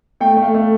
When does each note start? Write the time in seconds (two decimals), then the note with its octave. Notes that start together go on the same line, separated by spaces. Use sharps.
0.20 A3 G5
0.37 A3
0.43 F5
0.54 A3